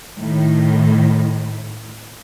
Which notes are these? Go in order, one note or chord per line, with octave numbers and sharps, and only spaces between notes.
A2 D#3